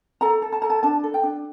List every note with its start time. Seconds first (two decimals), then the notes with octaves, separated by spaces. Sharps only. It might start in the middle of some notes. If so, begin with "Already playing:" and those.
0.21 A4 A#5
0.42 A4
0.52 A5
0.62 A4 A#5
0.70 A5
0.83 D4 A5
1.04 A4
1.14 G5
1.23 D4